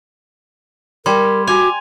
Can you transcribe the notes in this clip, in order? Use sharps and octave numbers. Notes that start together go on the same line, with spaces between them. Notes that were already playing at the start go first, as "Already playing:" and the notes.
G3 A#4 C6 G#6
F#4 G#5 D6 F7